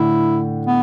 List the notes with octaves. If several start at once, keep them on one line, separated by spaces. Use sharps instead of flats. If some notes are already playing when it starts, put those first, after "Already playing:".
Already playing: A2 D3 E4
B3